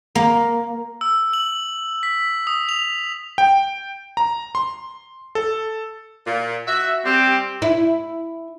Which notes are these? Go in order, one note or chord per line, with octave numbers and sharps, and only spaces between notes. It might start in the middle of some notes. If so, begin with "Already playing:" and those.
A#3
E6
F#7
B6
D#6
F7
G5
A#5
C6
A4
A#2
F#4 E5
G3 C4 G4
E4